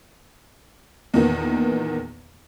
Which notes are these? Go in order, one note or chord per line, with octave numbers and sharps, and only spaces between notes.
E2 A#2 D#3 B3